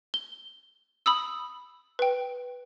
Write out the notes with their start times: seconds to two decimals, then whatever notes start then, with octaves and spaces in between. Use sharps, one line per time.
0.14 G7
1.06 B5 D#6 E6
1.99 B4 G5